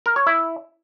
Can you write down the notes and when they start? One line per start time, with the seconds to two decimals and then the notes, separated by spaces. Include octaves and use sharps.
0.06 A#4
0.16 C#5
0.27 E4